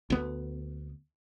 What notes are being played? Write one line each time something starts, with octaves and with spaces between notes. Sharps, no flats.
D2 B3